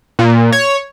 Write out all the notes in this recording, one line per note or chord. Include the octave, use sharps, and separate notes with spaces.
A#2
C#5